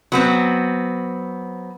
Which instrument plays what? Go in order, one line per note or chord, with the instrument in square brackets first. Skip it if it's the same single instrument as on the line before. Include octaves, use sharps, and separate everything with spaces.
[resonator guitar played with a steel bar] F#3 B3 C4